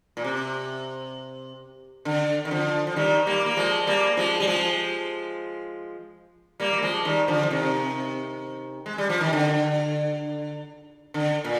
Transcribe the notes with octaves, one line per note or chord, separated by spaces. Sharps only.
A#2
C3
D3
D#3
D3 F3
F3
D#3 G3
G3 A#3
A#3
F3 G#3
G3 A#3
F3 G#3
G3
F3 G#3
G3 A#3
G3
F3 G#3
D#3 G3
D3 F3
F3
C3 D#3
G#3
G3
F3
D#3
D3
D3
A#2